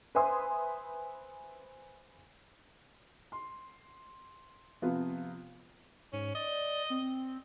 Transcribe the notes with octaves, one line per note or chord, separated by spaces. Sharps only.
B4 C5 E5 G#5 C6 D#6
C6
C3 F3 B3 F4
G#2 C#4
D5 D#5
C4